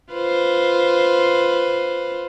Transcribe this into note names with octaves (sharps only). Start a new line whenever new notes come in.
F4 B4 C5